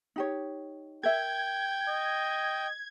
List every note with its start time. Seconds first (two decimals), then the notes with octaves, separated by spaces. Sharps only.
0.16 D#4 G4 C#5
1.03 A#4 E5 G5 G#6
1.88 D#5